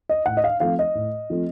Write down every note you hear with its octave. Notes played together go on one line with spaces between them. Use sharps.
D#5
A2 F#5
D#5
F5
F3 A3 C4 F4 F5
D#5
A2
F3 A3 C4 F4